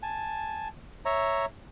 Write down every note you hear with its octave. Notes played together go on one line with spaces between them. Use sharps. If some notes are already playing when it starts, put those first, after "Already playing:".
G#5 A5
C#5 E5 A#5